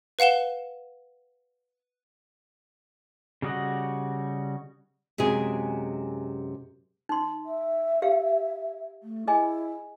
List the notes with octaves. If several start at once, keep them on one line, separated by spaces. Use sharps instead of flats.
B4 F5 F#5 E7 G7
C#3 G3 F#4 D#5 F#5
F#2 C3 G#3 G#4
D#4 C6
E5
G4 F5
A3
E4 G#4 D#5 G#5